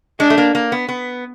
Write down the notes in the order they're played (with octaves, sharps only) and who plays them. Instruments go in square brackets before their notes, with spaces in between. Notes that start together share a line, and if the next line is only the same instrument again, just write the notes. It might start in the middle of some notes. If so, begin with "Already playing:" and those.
[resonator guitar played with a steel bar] G#3 [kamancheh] D4
[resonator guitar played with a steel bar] A3
A#3
A#3
B3
B3